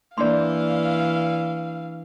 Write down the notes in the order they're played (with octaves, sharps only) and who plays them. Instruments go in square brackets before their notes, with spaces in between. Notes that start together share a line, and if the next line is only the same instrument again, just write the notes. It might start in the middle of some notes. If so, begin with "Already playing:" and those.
[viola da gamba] E3 [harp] A#3 D4 [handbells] D5 C6 [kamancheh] F5